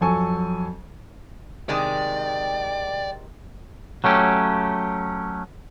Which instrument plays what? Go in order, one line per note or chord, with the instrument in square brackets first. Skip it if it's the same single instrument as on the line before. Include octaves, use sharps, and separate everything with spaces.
[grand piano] F2 F#3 A4 G#5 C#6
[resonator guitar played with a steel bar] C3 D#3 G#3 [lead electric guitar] D5 [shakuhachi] G5
[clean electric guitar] F#3 A3 C#4 G4